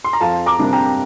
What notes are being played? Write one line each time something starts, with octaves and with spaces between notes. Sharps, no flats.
C6
A#5
F2 F5 A5
A#5 D6
C3 G3 A#3 D4
G5 A#5